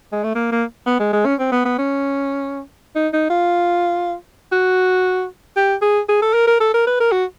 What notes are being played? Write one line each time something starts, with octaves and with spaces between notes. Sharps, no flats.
G#3
A3
A#3
A#3
B3
G#3
G#3
C#4
C4
B3
B3
C#4
D#4
D#4
F4
F#4
G4
G#4
G#4
A4
A#4
A#4
A4
A#4
B4
A#4
F#4